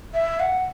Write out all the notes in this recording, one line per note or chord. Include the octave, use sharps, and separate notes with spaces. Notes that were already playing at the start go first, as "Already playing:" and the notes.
E5
F#5